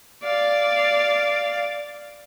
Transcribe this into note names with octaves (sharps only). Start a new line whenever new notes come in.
D5 F5